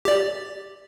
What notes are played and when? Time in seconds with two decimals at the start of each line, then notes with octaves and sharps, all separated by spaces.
0.05 G4 D5